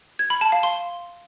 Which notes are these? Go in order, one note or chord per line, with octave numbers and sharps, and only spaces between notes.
G#6
B5
A5
F5
C6